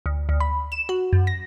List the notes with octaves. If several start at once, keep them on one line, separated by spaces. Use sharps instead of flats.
D2
D2
B5
E7
F#4
F#2
A#6